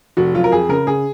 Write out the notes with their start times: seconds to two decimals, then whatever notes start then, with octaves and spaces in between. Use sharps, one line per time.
0.17 F1 F#4
0.34 F#3 F4
0.44 A#4
0.52 F2 G#4
0.69 C#3 A#4
0.87 C#3 G#4